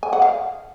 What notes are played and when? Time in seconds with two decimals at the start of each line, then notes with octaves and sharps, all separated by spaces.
0.03 G#5
0.13 F#5
0.22 F5